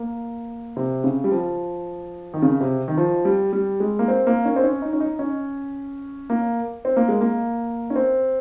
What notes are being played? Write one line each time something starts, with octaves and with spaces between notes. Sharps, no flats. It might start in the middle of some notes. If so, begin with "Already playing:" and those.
Already playing: A#3
C3
C#3
G3
F3
D#3
C#3
C3
D#3
F3
G3
G3
G#3
A#3
C4
A#3
C#4
C4
C#4
D#4
C#4
D#4
C#4
A#3
C4
A#3
G#3
A#3
C#4
C4